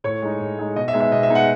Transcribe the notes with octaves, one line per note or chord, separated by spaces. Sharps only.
A2 C#5
G#3 D#4
A2
G#3 D#4
B2 D#5
E5
G#3 B3 D#4
E5
B2 D#5
E5
G#3 B3 D#4
F#5